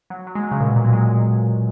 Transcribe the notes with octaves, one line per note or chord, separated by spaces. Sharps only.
F#3
F#3
G#3
F#3
C#3
A#2
B2
A#2
F#3
G#3